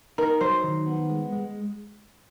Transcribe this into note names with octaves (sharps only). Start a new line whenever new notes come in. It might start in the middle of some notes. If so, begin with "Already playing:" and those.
D#4 A#4
F#3 C5
D#3
B3
G#3
G#3